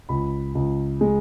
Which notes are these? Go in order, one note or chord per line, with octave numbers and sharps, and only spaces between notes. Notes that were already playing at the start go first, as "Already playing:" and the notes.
C#2 B5
C#2
G#3